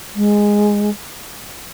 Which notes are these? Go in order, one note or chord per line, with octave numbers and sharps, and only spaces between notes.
G#3